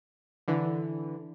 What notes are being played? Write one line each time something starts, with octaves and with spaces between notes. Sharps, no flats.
D3 E3